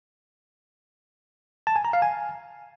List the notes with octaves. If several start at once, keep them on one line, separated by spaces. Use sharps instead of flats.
A5
G#5
A#5
F5
G#5